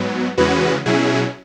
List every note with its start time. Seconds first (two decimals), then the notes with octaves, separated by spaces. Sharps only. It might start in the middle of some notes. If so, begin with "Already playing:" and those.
Already playing: G#2 F#3 B3
0.38 E2 C#3 E3 G#3 C#4 F#4 B4
0.86 B2 F#3 C#4 E4 G#4